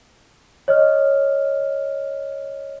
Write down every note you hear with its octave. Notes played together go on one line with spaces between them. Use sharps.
C#5 D#5 F6